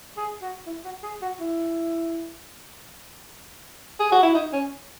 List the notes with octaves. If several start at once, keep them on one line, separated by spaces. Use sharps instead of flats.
G#4
F#4
E4
F#4
G#4
F#4
E4
G#4
F#4
E4
D#4
C#4